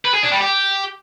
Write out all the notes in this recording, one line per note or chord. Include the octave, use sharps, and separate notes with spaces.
B4
G#4
D4
G3
G4